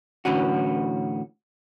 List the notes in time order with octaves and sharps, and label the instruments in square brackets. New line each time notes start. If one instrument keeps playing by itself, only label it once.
[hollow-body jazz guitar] A2 D3 E3 C#4 F#4